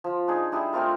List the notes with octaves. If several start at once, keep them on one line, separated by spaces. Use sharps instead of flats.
F3
D4 D#4 G#4
G3 D4 E4 G#4
A3 C4 F4 A#4